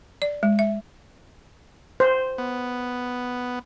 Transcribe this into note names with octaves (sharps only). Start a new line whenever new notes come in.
D5
G#3
E5
C5
B3